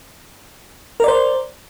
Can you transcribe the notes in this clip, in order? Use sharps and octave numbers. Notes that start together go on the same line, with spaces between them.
A#4 C5 D5